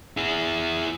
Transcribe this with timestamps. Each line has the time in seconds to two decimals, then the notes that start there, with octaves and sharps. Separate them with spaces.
0.17 E4 G#4